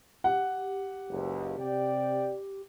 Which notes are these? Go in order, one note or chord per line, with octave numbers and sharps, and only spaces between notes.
G4 F#5
F#1 C#2
C3 D5 G5